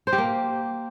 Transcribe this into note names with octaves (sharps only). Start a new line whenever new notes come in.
C5
G4
A#3